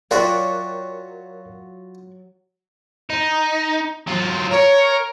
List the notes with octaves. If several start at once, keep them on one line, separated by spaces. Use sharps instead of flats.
F#3 F4 F#4 A#4 D5 E5 G5 C#6
D#4
F#3 F4
A#4 C#5